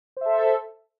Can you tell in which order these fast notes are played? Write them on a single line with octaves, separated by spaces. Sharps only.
C5 E5 A4